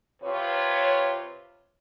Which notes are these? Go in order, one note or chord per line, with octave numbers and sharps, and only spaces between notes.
C3 F4 B4 C#5